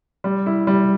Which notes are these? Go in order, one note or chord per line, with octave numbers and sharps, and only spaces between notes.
G3
E4
G3